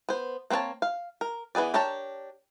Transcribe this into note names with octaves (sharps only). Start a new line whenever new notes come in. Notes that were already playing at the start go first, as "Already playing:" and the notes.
B3 C5
A#3 C4 B4 C#5 A5
F5
A#4
E3 B3 G#4 D5
D4 G4 A#4 C#5 A5